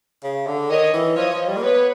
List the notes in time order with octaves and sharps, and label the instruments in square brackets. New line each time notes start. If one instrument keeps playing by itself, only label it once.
[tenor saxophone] C#3
D3
[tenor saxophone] D#3 [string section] C#5 D#5
[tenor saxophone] E3
[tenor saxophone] F3 [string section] C#5 D#5
[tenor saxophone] F3
G3
A#3
[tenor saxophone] B3 [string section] B4 C#5